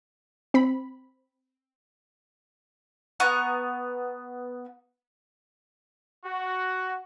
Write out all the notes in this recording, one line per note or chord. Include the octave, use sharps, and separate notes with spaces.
C4 B5
B3 A#5 C#6 F#6
F#4